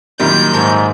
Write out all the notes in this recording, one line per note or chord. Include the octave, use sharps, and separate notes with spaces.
F#2 A#2 D#3 G3 G6
G#2 A4 A#4 C#5